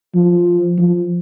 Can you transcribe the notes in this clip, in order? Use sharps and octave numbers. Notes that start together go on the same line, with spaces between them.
F3
F3